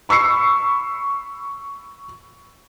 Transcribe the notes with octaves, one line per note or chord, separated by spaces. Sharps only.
B5 C#6 E6 C7 C#7